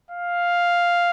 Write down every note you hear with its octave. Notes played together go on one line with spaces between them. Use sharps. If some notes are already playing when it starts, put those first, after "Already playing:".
F5